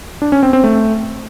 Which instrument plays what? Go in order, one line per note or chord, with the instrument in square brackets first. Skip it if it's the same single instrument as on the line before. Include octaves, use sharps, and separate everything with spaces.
[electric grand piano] D4
C#4
C4
C4
A3